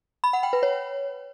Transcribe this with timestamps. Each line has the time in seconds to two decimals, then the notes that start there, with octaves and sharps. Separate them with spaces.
0.24 B5
0.33 F#5
0.43 G5
0.53 B4
0.63 C#5